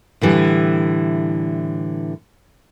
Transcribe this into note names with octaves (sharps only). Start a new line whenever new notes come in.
A2 D3 E3 G3